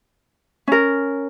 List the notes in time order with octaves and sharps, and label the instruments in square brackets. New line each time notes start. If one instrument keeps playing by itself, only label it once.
[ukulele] C#4 A#4